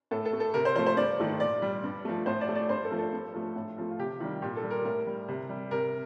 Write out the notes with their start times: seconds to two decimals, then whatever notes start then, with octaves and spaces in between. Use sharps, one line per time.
0.11 A2 A4
0.25 A4
0.33 A3
0.40 A4
0.54 C3 A#4
0.65 C5
0.75 F3 C5
0.78 A3
0.86 C5
0.97 G2 D5
1.19 D#3 A3
1.40 A#2 D5
1.62 G3
1.84 G2
2.05 F3 A3
2.26 A2 C5
2.41 D5
2.49 A3
2.55 D5
2.69 G2 C5
2.84 A4
2.91 F3 A3
2.98 A4
3.13 G2
3.34 F3 A3
3.56 A2
3.78 F3 A3
3.90 F4
3.99 C3 G4
4.20 D#3 G3
4.42 A#2 G4
4.57 A4
4.63 G3
4.70 A#4
4.85 A2 A#4
5.06 G3
5.28 C3
5.49 G3
5.71 C3 A#4